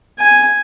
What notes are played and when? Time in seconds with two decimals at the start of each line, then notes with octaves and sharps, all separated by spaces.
0.19 G#5